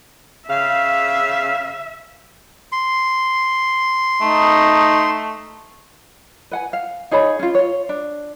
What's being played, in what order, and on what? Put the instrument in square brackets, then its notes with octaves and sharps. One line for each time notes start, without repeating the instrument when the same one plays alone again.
[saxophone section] C#3 F5 [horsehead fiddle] E5
[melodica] C6
[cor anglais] A3 [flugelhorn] D#4
[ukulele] B4 F#5 G#5
F5
D#4 G#4 C#5 B5
C#4 F4
F4 C#5
D4